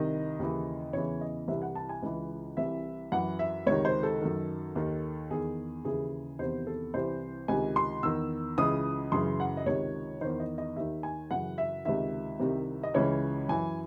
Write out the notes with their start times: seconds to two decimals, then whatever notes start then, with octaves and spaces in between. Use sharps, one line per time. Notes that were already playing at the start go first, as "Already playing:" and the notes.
Already playing: C2 C3 D#3 D#5
0.39 D#2 C#3 E3
0.93 E2 C#3 E3 C#5
1.21 D#5
1.48 C2 C3 E3 E5
1.62 F#5
1.75 A5
1.89 G#5
2.03 C#2 C#3 E3
2.57 C2 C3 E3 E5
3.12 F#2 E3 F#5
3.39 E5
3.67 C#2 C3 D#3 C#5
3.85 C5
4.03 A4
4.21 F#2 D#3
4.75 D#2 D#3
5.30 E2 D#3 G#4
5.85 D#2 C#3 E3 G#4
6.39 E2 C3 D#3 C5
6.67 A4
6.94 C2 C3 E3 C5
7.48 C#2 C3 D#3 G#5
7.76 C6
8.03 E2 D#3 E6
8.58 C#2 C#3 E3 D#6
9.12 F#2 C#3 E3 C6
9.40 F#5
9.57 D#5
9.66 C#2 C3 D#3 C#5
10.21 E2 D#3 C5
10.40 D#5
10.58 D#5
10.76 D#2 D#3 E5
11.03 G#5
11.31 F#2 C#3 E3 F#5
11.58 E5
11.85 C#2 C3 D#3 E5
12.40 C2 C3 D#3
12.83 D#5
12.94 C#2 C#3 E3 C#5
13.49 F#2 E3 G#5